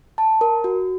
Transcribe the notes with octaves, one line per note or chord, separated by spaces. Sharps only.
A5
A#4
F#4